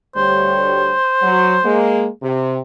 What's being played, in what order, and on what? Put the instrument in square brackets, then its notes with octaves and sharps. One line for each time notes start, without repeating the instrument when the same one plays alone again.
[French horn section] D2 G3 C#5 [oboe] C5
[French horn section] F#3
G#3 A#3 G#4
C3